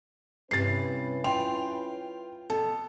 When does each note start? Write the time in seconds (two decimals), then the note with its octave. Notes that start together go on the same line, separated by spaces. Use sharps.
0.51 G2 C3 C#4 E4 B4 A6 C7
1.24 F4 G5 C6 F7
2.50 B2 A4